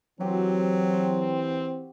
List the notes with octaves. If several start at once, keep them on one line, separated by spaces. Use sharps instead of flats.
E3 F#3 C4 F#4 G4